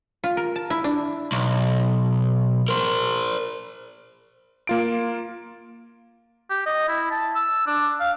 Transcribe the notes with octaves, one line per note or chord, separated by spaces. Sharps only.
F4
A#4
A5
E4
D4
B1
A#4 C5
A#3 F4 D7
G4
D#5
E4
A5
E6
D4
F5